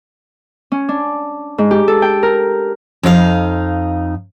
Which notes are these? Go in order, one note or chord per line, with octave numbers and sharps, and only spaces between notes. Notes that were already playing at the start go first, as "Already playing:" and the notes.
C#4
D4
G#2
G4
A4
G5
A#4
F2 D#4 F4 F5